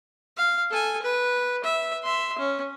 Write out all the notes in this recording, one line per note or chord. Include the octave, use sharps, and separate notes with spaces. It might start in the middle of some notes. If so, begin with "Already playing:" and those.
F5
A4 G#5
B4
E5
E5 C6
C#4